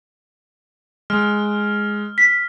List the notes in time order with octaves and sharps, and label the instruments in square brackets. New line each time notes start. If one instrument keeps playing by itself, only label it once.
[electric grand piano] G#3 [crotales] F6
[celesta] B6